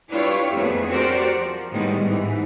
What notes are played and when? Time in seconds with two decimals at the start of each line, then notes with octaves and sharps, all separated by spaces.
0.12 D4 E4 F4 G4 B4 C#5
0.53 F2 A3 B3 G#4
0.90 F#4 G4 A#4 C5 D5
1.33 F3
1.71 A2 D3 D#3 G3 G#3 B3
2.02 G#2 E3